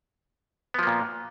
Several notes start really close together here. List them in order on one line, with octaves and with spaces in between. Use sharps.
B3 F3 A#3 A#2